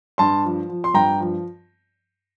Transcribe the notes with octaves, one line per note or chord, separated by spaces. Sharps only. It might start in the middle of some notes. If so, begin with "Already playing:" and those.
G2 A5 C6
F3
F3
C6
G2 G5 A#5
F3